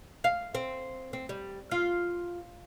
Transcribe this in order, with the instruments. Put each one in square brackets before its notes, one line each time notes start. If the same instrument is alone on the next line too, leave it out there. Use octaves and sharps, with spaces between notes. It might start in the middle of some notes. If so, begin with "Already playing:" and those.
[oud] F5
C4
C4
G3
F4